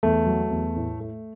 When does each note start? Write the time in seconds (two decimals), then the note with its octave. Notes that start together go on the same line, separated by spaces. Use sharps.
0.03 E2 A3
0.27 F#3
0.51 E2
0.76 A2
1.00 A3